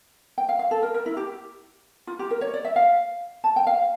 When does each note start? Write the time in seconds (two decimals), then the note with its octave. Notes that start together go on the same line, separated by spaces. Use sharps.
0.38 G5
0.49 F5
0.59 F5
0.71 A4
0.83 A#4
0.94 A#4
1.06 E4
1.17 G4
2.07 F4
2.19 G4
2.31 A#4
2.41 C#5
2.54 D5
2.65 E5
2.76 F5
3.44 A5
3.56 G5
3.67 F5